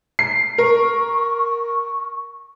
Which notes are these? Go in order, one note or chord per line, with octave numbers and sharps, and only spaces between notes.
C7
A#4 C#6